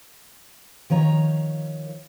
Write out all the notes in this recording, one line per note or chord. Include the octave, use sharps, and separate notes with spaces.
D#3 F3 C#5 A#5